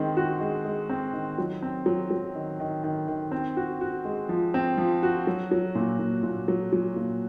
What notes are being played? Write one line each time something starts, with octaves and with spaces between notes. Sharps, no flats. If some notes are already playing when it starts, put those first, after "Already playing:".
Already playing: D#3 G#3 C4
F#4
G#3
G#3
C4
D#3
F#3
C4
F#3
F#3
D#3
D#3
D#3
D#3
C4
F#4
F#4
G#3
F3
C4
F3
F#4
F#3
F#3
A#2
A#2
A#2
F#3
F#3
A#2